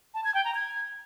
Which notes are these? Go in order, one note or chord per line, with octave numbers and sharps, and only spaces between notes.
A5
G#6
G5
A#5
G#6